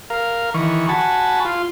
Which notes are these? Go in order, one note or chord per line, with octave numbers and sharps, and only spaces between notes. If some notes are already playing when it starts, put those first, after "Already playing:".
A#4 F5
D#3 E3 C#6
F#4 G#5 A5 B5 C#6
F4